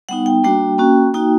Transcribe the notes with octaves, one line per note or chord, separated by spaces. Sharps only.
G3 B3 D#4 F#5
G5
G3 A#3 D4 F#4 G5
A#3 C#4 F#4
A#3 D#4 F#4 G5